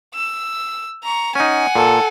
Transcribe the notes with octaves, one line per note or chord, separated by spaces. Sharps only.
E6
A#5 C#6
C#4 D#4 F#5 G#5
A#2 A4